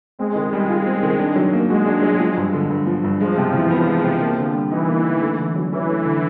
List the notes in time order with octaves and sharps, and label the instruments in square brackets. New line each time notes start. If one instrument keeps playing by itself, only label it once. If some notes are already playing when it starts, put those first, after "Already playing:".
[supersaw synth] G#3 [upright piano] C4
[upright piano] D#3
G3
F4
C4
D#3
D4
F#3
A#3
[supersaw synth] G#3 [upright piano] F#4
[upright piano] D4
F#3
F3
G2
D3
G2
F3
G2
[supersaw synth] F3 [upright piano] G#3
[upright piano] C3
E3
[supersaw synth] F3 [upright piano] B3
[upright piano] G#3
C3
A#3
D3
G3
[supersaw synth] E3 [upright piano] D#4
[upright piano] A#3
D3
A3
D3
F#3
[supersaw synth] E3 [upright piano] C#4
[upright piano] A3
D3